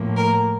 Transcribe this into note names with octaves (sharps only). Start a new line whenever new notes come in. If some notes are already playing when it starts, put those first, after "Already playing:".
Already playing: A2 F3 A#3
A#4